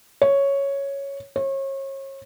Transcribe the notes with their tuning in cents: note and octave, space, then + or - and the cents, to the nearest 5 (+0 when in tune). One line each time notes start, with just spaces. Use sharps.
C#5 +0
C#5 -35